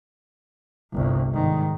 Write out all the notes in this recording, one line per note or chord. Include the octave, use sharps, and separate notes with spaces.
G1 C2
G#2 D#3